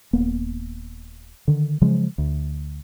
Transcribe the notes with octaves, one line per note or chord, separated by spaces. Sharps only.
D#1 A#3 B3
D3 D#3
C#3 F3 F#3 G#3
D2